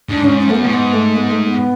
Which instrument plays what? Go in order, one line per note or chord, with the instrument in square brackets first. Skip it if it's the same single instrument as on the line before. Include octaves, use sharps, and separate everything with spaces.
[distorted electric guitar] G#2 [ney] D4
[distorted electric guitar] G#2 [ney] C#4
[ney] C#4
[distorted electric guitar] F#2 [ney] A3
[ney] B3
[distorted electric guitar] A2
[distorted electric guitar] G#2 [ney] B3
[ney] A3
B3
A3
B3